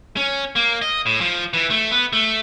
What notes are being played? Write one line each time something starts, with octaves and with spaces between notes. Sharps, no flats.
C#4
A#3
D#5
A2
F3
E3
A3
B3
A3